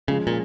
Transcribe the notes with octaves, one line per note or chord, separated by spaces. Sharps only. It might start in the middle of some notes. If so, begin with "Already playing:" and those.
C#3 F3 G#3 C#4
A#2